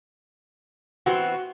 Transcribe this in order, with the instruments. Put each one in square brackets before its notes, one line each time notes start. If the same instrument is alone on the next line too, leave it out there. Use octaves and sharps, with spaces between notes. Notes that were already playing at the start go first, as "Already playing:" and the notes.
[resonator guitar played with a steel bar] E3 B3 C4 [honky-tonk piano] F#4